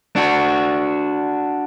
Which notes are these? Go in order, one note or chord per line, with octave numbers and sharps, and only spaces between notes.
D4 F#4